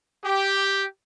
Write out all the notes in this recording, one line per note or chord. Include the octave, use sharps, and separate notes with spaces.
G4